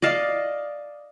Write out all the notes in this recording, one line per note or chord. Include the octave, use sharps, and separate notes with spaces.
D5 D#5 F5 A5